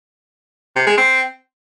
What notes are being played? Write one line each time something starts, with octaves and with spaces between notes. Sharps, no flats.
C3
G#3
C4